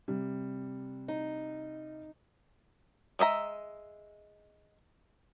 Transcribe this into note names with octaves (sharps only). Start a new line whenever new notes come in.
C3 G3
D#4
G#3 D#5 E5 A#5